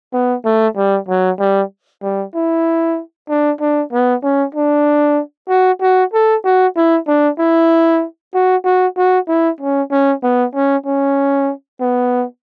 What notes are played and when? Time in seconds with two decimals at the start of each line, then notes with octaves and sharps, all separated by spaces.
0.13 B3
0.45 A3
0.77 G3
1.09 F#3
1.40 G3
2.03 G3
2.35 E4
3.29 D4
3.61 D4
3.93 B3
4.23 C#4
4.55 D4
5.49 F#4
5.82 F#4
6.14 A4
6.45 F#4
6.77 E4
7.08 D4
7.39 E4
8.34 F#4
8.65 F#4
8.97 F#4
9.28 E4
9.60 C#4
9.92 C#4
10.23 B3
10.55 C#4
10.86 C#4
11.81 B3